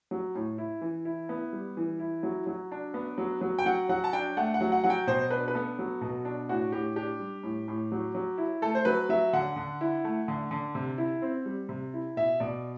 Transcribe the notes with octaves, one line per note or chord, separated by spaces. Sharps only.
F#3
A2
E4
E3
E4
B3
G3
E3
E4
F#3
F#3
D4
B3
F#3
F#3
G5
F#3 F#5
F#3 F#5
A5
D4 G5
A3 F#5
F#5
F#3
F#5
F#3 F#5
G5
B2 C5
D4 B4
B4
B3 A4
F#3
B2
D4
A2 F#4
A2 G4
D4 G4
G3
A2
A2
F#3
F#3
E4
A3 A4
C5
F#3 B4
F#3 E5
D3 F#5
D3
E4
A3
D3
D3
C3
E4
C4
G3
C3
E4
B2 E5
B2 D5